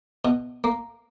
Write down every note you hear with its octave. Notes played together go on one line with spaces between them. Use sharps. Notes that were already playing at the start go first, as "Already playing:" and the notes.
B2
A#3